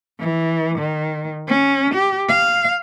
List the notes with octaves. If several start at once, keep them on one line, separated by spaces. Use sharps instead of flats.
E3
D#3
C#4
G4
F5